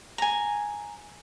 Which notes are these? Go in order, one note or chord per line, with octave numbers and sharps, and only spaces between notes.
G#5 A#5